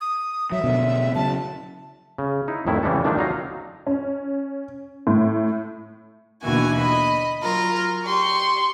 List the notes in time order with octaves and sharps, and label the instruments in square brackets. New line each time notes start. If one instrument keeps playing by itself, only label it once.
[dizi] D#6
[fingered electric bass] F#3 [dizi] E5
[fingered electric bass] B2 D3
[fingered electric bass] C#3 F#3 [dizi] A5
[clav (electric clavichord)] C#3
D#4 E4
F2 A2 D#3 E4
C#3 E3 G3 G#3 A4
D#3 F3 G3 A3 D4
F#3 D#4 F4 F5 A#5
[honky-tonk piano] C#4
A2
[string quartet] D#2 B2 D3 E3 F#4 G#5
D#5 B5
F#3 F4 A#4
G4 C6 C#6